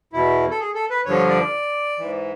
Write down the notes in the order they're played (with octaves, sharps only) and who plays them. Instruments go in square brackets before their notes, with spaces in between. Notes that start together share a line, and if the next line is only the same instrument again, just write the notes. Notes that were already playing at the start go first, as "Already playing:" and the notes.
[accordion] E2 B2 E4
A4
G#4
A4
B4
G2 D3 F3 C#5
D5
G#2 E3